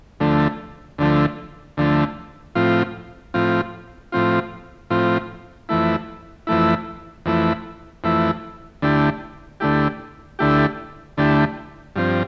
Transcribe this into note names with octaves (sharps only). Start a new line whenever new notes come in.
D2 D3 F3 A3
D2 D3 F3 A3
D2 D3 F3 A3
A2 F3 C4 F4
A2 F3 C4 F4
A2 F3 C4 F4
A2 F3 C4 F4
F2 E3 A3 E4
F2 E3 A3 E4
F2 E3 A3 E4
F2 E3 A3 E4
D2 D3 A3 E4 G4
D2 D3 A3 E4 G4
D2 D3 A3 E4 G4
D2 D3 A3 E4 G4
G2 F3 C4